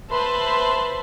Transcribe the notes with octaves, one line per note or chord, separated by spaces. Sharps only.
B4 C5 E5 A5 B5 C6